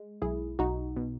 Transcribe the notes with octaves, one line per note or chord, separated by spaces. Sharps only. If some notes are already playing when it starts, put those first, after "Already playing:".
Already playing: G#3
B1 E4 G#4
B1 D#4 F#4
B2